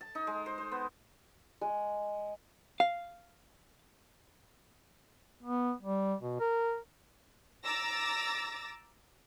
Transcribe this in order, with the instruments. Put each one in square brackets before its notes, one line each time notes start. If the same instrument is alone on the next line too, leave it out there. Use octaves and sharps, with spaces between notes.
[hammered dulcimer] A5
D#4
G#3
C5
C5
B3
[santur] G#3
[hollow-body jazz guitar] F5
[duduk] B3
G3
B2
A#4
[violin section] A#5 D6 E6 A6 A#6